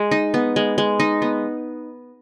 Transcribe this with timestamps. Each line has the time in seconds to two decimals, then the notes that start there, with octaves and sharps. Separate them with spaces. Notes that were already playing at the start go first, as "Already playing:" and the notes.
Already playing: G#3
0.12 D#4
0.34 B3
0.56 G#3
0.78 G#3
1.00 D#4
1.22 B3